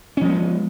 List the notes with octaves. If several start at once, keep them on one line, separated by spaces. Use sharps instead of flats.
F3 G#3 B3 C#4